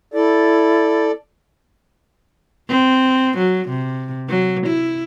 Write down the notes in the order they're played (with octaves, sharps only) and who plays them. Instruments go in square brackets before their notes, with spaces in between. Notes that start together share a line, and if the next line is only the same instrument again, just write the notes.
[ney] E4 [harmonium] A4 D5
[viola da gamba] C4
F#3
C3
F#3
E4